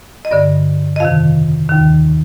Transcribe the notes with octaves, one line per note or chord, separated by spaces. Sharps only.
D#5
G2 D3 D5
D#5
F2 C3 D#3 F5
D#2 D#3